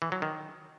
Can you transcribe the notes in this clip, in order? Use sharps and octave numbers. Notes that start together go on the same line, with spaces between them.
E3
F#3
D#3